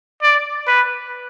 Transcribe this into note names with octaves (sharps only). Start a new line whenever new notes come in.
D5
B4